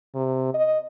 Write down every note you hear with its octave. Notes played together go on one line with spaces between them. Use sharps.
C3
D#5